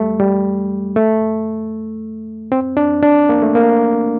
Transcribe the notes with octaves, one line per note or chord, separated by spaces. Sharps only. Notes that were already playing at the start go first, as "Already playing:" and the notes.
Already playing: G3 A3
G3
A3
C4
D4
D4
A#3
A3
A#3